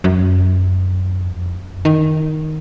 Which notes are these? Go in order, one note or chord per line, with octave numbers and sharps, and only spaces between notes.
F#2
F2
F#2
D#3